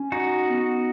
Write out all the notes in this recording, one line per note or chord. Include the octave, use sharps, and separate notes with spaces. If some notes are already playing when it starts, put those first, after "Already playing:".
Already playing: C#4
D#4 F#4
B3